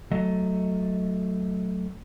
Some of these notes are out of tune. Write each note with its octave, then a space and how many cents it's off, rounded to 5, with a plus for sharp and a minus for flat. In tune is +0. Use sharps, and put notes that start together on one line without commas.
F#3 +0 A3 +0 D#5 +20